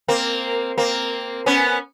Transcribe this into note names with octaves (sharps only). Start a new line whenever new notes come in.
A#3 C4
A#3 C4
B3 C#4